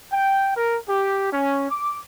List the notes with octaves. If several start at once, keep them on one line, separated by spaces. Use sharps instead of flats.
G5
A#4
G4
C#4
D6